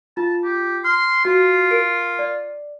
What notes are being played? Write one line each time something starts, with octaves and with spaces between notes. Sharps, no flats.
F4 A5
G4
C6 F6
F4 F#4
A#4 D7
D5